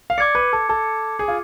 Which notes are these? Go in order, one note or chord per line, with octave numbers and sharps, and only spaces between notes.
F5
D5 D6 G#6 C#7
B4
A4
A4
G#4
F4